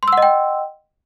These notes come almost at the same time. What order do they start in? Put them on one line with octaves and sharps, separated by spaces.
C6 E6 F#5 D#5 G5